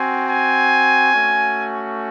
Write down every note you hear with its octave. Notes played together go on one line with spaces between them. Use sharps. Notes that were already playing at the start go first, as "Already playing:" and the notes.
Already playing: C4 F#4 G#5
G#5
A3 C#4 F#4